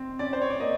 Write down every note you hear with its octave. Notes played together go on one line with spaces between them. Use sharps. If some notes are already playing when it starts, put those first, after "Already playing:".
Already playing: C4
C#4 D5
C5
C#5
D5
A#3 D#5